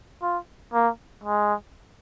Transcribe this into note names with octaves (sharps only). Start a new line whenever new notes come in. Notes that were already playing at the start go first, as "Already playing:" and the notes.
F4
A#3
G#3